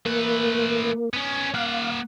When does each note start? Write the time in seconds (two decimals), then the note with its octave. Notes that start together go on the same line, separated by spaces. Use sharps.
0.06 A3 A#3 B4
1.13 B3 C#4
1.54 A#3 F5 F#5